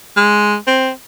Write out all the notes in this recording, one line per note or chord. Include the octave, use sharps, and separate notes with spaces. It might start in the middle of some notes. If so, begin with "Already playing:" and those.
G#3
C4